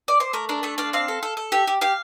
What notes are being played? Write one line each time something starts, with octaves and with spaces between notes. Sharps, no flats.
D5
C5
A3 A#4
D4 A#4
A3 A4
D4 F5
C4 F5
A4
A4
A4
G4 E5
G4
G4 F5